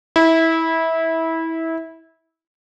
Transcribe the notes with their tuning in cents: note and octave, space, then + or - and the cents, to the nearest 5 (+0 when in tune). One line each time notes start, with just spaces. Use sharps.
E4 -20